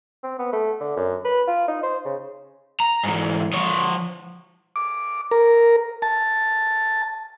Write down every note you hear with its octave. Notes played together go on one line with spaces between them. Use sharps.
C4
B3
A3
D3
F#2
B4
F4
D#4
C5
C#3
A#5
G#2 E3
F3 C#5
D6
A#4
A5